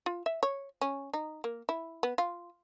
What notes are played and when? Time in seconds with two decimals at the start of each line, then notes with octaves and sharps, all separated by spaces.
0.06 F4
0.26 E5
0.43 C#5
0.81 C#4
1.13 D#4
1.44 A#3
1.69 E4
2.03 B3
2.18 F4